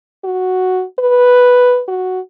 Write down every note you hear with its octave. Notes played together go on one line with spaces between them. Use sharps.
F#4
B4
F#4